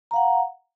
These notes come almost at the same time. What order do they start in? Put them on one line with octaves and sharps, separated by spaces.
A#5 F5 F#5